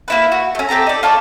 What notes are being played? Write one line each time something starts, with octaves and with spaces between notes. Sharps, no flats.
A#3 E4 B4
F#4
A3 C#4
C4 G4 A4 A#5
D#4 D5
F4 A4 C#5 D5